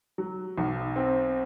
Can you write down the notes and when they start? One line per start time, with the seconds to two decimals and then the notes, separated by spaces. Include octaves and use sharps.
0.18 F#3
0.58 B1
0.96 C4